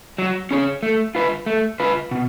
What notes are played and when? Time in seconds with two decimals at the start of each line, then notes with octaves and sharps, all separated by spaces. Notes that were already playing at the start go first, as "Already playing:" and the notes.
0.18 F#3
0.51 C#4 G#4 C#5
0.83 A3
1.15 F4 B4
1.46 A3
1.80 F4 B4
2.11 B2